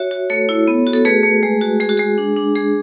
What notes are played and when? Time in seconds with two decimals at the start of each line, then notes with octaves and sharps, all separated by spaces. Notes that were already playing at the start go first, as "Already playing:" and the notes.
Already playing: F#4 C#5 E5
0.11 F#4
0.30 A3 A4 C#5
0.49 E4
0.68 B3
0.87 F#4
0.93 A4
1.05 A3 G#4 B4
1.23 A3
1.43 G#3
1.61 F#4
1.80 G#3 G#4
1.89 F#4
1.97 G#3 G#4
2.18 D4
2.36 D4
2.55 G#3 G#4